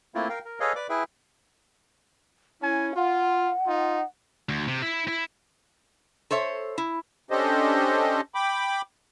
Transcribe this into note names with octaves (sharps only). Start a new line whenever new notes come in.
A3 A#3 C4 E4 F4
A#4 F5 G5
A#4
G#4 A4 B4 C#5 D#5 F5
B4 D5 D6
E4 G#4 B4 E5 G5
C#4 E4 G#5
F4 F#5
D#4 F4
D2
C3
E4
E4
A4 C5 C#5 E5
E4
C#4 D4 G4 A4 C5 D#5
G5 B5 D6